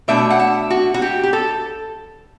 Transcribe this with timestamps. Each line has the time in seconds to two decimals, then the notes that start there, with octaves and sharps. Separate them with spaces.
0.08 B2 A3 D4 E5
0.30 F#5
0.40 E5
0.70 F#4
0.94 F#4
1.02 G4
1.23 G4
1.33 A4